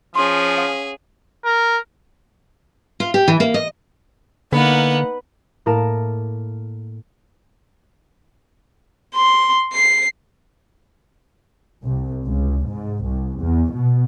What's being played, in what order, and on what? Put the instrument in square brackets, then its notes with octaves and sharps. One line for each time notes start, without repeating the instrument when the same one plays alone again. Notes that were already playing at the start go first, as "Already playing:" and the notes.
[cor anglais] F3 [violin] C#4 [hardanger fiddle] G#4 [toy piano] C6
[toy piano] F5 F#5 D#6
[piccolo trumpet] A#4
[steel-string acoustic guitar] F4
G4
E3
A#3
D#5
[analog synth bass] D3 [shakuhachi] A#3 [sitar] B3 [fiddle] D#4 F#5
[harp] A2 A#3 A#4 A5 D7 E7
[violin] C6
C7
[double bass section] C2
C#2
G#2
C2
E2
B2